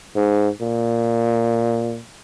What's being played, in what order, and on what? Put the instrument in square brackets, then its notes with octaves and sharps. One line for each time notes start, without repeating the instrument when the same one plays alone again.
[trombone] G#2
A#2